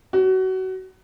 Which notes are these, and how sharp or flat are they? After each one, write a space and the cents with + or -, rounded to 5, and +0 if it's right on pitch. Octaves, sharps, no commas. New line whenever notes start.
F#4 +25